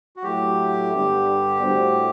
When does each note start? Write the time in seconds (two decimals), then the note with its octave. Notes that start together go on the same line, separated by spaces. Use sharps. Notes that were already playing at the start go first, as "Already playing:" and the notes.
0.16 F#4
0.23 A2 F#3 A3 E4 G4 A4
0.92 G2 D3 G3 B3 D4
1.62 A2 G3 D4 F#4 C5